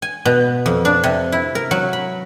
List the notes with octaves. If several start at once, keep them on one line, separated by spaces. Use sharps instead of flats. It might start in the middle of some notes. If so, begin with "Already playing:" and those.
G#5
B2
F2
D4
C3
E4
A#4
F#3
B5